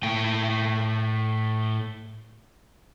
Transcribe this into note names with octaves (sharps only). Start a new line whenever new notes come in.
A2 G5